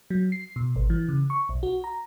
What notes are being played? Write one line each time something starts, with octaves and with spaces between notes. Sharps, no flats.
F#3
C7
B2
G#1
E3
C#3
C#6
B1
F#4
A#5